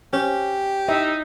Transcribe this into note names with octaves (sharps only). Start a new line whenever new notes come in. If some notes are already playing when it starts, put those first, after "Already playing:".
C#4 G4
D#4 E5